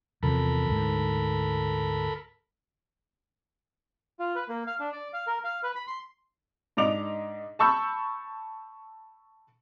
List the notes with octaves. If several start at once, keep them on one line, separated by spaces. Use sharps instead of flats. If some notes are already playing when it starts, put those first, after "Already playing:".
E2 C3 F3 A4 A#4 B5
D2 G#2
F4
B4
A#3
F5
D4
D5
F5
A#4
F5
B4
B5
C6
G#2 D4 D#5 D6 F7
A5 B5 C#6 E6 G6